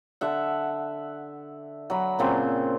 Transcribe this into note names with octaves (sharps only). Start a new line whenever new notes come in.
D3 E5 F#5
F#3 B5
A#2 C#3 C4